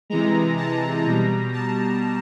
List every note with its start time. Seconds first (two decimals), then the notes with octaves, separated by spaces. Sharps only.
0.10 C3 E3 G#3 A#5
0.57 A5
1.06 B2 G3 A#5
1.53 A5